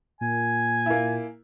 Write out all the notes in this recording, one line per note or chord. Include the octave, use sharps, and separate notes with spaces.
A#2 G#5
A#3 E4